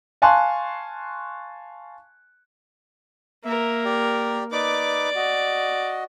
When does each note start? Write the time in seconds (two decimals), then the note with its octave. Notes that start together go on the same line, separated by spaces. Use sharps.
0.22 F5 G#5 A5 C6 C#6 F#6
3.44 A#3 A#4 E5
3.85 G4 D5
4.51 D#4 B4 D5 D6
5.15 F#4 D#5